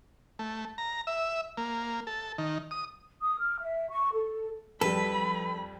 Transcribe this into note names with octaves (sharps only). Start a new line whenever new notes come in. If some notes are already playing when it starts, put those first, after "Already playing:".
A3
A#5
E5
A#3
A4
D#3
D#6
D#6
F6
E5
C#6
A4
F2 G3 A4 B4 B5